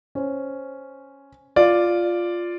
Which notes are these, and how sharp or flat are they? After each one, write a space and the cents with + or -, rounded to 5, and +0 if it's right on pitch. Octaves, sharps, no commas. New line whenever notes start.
C#4 +0 C5 +0
F4 +0 D5 +0